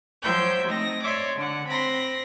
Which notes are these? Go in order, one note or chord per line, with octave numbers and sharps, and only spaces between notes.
F3 F#3 C5 E5 G5 G6
A3 C4 D#4 A#6
C#5 D5 E5 C6 D6
D3 F#5
C4 B5 C6 A#6